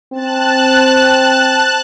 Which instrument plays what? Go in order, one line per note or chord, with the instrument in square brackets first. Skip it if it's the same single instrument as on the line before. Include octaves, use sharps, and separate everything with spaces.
[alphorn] C4 [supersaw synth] A5 F#6